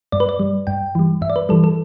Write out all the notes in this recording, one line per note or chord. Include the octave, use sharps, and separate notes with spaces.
G2 D5
B4
D5
G3
G2 G5
E3 G3
G2 E5
D5
B4
E3 G3 A4
A4